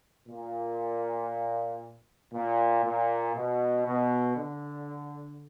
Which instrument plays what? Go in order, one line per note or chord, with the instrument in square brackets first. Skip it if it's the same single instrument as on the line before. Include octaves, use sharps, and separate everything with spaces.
[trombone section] A#2
A#2
A#2
B2
B2
D3